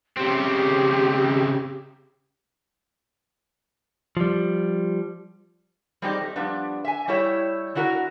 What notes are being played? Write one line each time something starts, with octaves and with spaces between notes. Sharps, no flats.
C#3 C4 G4
F3 G3
G3 G#3 C4 D#4 G4 D5
A3
F3 G3 B3 D4
E5 G#5
G3 A3 E4 G4 C#5 E5
D3 E4 F#4 A#4